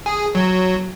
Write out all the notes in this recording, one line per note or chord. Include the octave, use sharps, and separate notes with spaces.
G#4
F#3